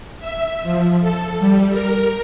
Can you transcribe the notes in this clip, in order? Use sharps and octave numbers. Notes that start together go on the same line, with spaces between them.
E5
F3
A4
G3
A#4